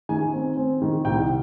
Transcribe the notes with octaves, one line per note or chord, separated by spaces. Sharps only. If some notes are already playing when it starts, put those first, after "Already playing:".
D#3 G#5
C4
C4
D#3
C2 G5